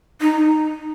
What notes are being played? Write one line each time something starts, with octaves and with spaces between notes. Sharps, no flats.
D#4